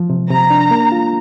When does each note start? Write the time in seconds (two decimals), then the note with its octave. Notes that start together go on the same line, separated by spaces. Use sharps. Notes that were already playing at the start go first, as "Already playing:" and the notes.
Already playing: F3
0.10 C3
0.30 C3 A#5
0.50 D4
0.71 A#3
0.92 F4